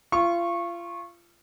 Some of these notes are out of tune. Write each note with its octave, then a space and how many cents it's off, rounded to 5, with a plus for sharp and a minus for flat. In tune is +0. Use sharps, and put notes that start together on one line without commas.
F4 -30 C#6 -20